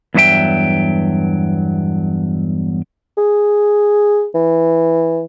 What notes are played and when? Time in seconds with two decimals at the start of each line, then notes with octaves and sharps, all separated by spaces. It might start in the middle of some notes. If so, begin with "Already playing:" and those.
0.14 E2 G2 F#3 C4 E5 G5
3.18 G#4
4.35 E3